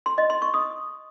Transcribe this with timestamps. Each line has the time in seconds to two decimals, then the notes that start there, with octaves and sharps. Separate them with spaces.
0.06 C6
0.18 D#5
0.30 C6
0.42 C#6
0.54 D#6